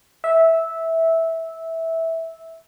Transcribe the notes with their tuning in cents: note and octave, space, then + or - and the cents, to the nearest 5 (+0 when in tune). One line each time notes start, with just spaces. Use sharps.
E5 -15